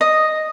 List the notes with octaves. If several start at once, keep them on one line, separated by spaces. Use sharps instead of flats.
D#5